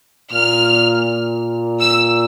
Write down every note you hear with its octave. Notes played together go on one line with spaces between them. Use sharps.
A#2 F6
A#2
E6